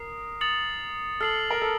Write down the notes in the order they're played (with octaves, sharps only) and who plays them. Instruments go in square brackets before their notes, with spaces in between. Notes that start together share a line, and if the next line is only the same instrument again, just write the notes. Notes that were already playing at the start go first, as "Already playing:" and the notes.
Already playing: [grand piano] A#4 [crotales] D#6 C7
[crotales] D#6 A6 C#7 F#7
[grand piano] A4 [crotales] F6 C7 F#7
[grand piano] A#4
A4